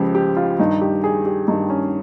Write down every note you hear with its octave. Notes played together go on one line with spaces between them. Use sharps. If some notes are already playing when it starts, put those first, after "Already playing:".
Already playing: C#2 C#3 F3 G4
G4
F4
G2 D#3 D#4
G4
G#4
G4
G2 D#3 D#4
C#4